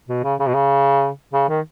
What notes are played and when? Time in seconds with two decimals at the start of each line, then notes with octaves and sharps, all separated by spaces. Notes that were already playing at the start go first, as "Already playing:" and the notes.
0.08 B2
0.24 C#3
0.40 C#3
0.47 B2
0.54 C#3
1.33 C#3
1.49 D#3